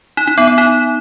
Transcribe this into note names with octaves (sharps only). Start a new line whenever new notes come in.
D#4
D#4
B3
B3
D#4